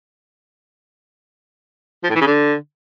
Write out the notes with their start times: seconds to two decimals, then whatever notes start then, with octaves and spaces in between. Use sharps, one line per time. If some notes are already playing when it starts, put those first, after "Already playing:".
2.04 F3
2.09 A2
2.15 E3
2.21 C#3
2.27 D3